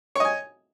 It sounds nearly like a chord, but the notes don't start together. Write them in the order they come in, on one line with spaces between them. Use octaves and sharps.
C#5 D#5 G#5